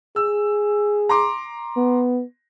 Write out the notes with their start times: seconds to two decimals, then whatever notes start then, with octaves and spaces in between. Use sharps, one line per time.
0.16 G#4 E6
1.09 A#5 C6 D6
1.77 B3